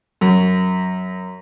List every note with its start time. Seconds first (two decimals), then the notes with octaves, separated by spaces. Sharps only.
0.21 F#2